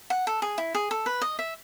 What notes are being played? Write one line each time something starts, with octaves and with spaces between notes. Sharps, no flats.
F#5
A4
G#4
E4
G#4
A4
B4
D#5
E5